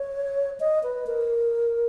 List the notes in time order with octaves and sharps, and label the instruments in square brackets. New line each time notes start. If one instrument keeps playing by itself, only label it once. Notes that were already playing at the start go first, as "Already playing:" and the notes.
Already playing: [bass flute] C#5
D#5
B4
A#4